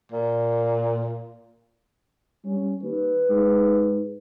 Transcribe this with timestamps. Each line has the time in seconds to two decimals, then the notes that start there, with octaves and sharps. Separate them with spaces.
0.12 A#2
2.45 G3 C#4
2.83 D#2 B4
3.30 G#2